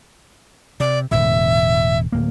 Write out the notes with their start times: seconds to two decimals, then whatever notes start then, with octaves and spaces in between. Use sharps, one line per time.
0.80 C3 D5
1.11 E1 A2 D3 E5
2.12 D1 A#3